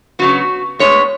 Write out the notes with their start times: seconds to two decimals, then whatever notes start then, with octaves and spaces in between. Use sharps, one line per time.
0.19 C#3 F#3 B3 F#4
0.79 A2 G#3 B3 C#5